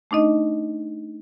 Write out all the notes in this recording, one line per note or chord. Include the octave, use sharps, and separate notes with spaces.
A3 D4 D#4 D#5